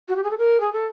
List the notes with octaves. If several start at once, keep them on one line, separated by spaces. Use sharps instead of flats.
F#4
G4
G#4
A4
A#4
G#4
A4